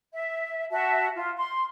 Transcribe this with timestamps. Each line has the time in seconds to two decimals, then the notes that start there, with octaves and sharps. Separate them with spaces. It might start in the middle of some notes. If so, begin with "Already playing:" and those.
0.14 E5
0.71 F#4 E5 A5
1.15 F4
1.36 C6